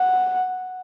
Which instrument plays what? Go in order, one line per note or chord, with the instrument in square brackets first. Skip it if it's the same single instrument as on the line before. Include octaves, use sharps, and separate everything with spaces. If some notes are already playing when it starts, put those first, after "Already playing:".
Already playing: [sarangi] F#5